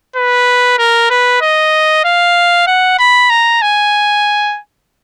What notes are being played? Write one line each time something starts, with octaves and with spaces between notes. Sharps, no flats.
B4
A#4
B4
D#5
F5
F#5
B5
A#5
G#5